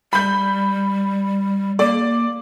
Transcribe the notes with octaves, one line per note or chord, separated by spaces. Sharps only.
G3 B5 G6
A#3 D5